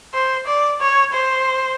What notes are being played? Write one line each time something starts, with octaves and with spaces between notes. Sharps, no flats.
C5
D5
C#5
C5